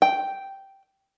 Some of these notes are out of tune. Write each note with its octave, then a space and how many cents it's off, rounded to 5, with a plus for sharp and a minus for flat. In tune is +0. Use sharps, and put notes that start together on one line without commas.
G5 -5